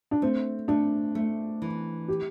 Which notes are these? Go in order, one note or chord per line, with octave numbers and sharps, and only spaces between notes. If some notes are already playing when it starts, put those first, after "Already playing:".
D4
A3 C4
A3 D4
A3
E3
G4